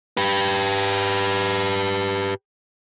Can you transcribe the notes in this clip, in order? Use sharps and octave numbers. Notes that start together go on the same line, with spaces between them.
G4 B4